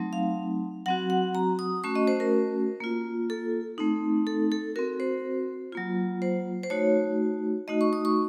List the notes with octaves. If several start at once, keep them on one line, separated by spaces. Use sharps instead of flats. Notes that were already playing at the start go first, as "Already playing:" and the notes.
Already playing: F#3 A3 C4 D#4
F5
F#3 C4 F#4 F#5
F#5
A#5
D#6
A3 C#4 F#4 C#6
D#5
C5
A#4
A#3 F4
A4
A3 C4 D#4
A4
A4
C4 F#4 A#4
C5
F#3 A#3 F4
C5
C5
A3 D#4 F#4 C#5
A3 D#4 F#4 D#5
C#6
D#6
C#6